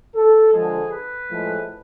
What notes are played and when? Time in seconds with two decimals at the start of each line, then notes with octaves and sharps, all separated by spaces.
0.15 A4
0.53 D3 F3 G#3 G#4
0.92 B4
1.30 A2 F3 G#3